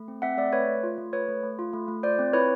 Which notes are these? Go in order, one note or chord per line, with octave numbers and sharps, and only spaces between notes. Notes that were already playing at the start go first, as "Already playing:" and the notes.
Already playing: A3
C4
C4 E5 F#5
A3 D5 E5
A3 B4 C#5
A3
F4
A3
A3 B4 C#5
A3
A3
F4
A3
A3
F4 C5 D5
C4
E4 B4 C#5